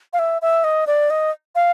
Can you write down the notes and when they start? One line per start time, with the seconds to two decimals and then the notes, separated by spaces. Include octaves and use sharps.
0.13 F5
0.19 E5
0.42 E5
0.64 D#5
0.87 D5
1.10 D#5
1.55 F5